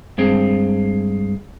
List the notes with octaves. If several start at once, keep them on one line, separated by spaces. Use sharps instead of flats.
G2 G#3 C4